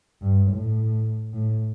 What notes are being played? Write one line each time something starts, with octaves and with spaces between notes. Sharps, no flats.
G2
A2
A2